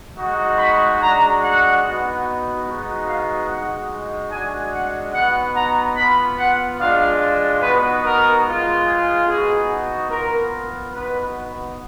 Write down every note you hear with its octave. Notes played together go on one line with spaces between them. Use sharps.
G#3 D#4 F#4
B5
G#3 D4 F#4 A#5
F#5
B3 D#4 F#4
G#3 B3 D#4 F#4
F5
G#3 D#4 F#4 F#5
G#3 D4 F#4 G#5
F#5
B3 D#4 F#4 F#5
A#5
B3 F4 B5
F#5
G#3 D4 F4 F5
B3 D#4 F#4 B4
A#4
G#3 B3 F4
G#4
B3 D#4 F#4 G#4
B3 F4 A#4
B3 D#4 F#4 B4